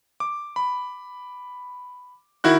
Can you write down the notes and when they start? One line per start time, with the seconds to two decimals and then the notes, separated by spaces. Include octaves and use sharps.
0.20 D6
0.56 B5
2.44 D#3 E4 F#4 F#6